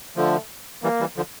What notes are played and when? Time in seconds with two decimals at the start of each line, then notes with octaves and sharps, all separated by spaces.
0.16 D3 F3 A3
0.83 E3 G3 A#3
1.00 E3 G3
1.17 D3 F3